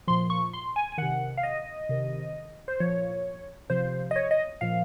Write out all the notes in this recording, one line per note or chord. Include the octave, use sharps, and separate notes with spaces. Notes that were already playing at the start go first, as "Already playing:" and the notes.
A#2 F3 C6
C#6
C6
G#5
G#5
C3 D#3 F#5
F5
D#5
C3 D#3
C5
A#2 F3 C#5
C3 F3 C5
D#5
C#5
D#5
A#2 F3 F5